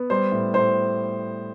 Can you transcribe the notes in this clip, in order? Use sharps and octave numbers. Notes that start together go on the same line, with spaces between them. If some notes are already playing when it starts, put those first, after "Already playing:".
Already playing: B3
G3 C5
A2
A2 C5